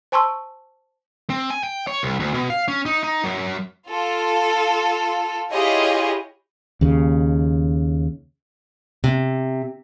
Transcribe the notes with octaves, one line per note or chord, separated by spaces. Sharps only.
C5 G#5 A5 C6 C#6 E6
C4
G#5
G5
C#5
C2
D2
B2
F5
C#4
D#4
D#4
F#2
F4 A4
E4 F4 G4 G#4 C#5 D#5
D#2 C#3
C3